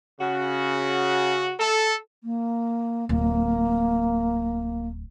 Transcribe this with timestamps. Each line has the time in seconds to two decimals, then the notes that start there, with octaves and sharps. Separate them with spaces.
0.21 C#3 F#4
1.60 A4
2.24 A#3
3.09 D1 A#3